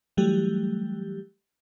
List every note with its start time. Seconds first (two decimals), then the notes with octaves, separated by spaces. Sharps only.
0.17 E3 F#3 G3 A3 G4